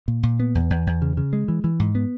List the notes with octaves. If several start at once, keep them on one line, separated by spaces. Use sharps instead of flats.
A#2
A#2
B3
E2
E2
E2
C#3
C#3
G#3
E3
E3
G#2
B3